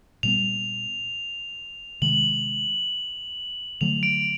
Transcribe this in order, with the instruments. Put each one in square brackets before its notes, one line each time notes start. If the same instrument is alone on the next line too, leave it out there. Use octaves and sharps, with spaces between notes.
[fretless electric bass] A#2 G3 B3 [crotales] F7
[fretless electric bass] C3 D#3 G#3 [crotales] F#7
[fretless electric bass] D3 F#3 A3 [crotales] F7
[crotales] D7